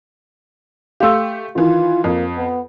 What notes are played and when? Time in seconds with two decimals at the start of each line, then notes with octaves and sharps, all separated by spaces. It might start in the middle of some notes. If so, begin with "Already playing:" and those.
1.00 A3 G4 F5 C6 E6
1.56 D#3 E3 F4
2.04 F2 A#3
2.37 B3